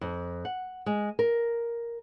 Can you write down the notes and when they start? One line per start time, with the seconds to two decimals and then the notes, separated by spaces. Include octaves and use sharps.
0.01 F2
0.45 F#5
0.86 G#3
1.19 A#4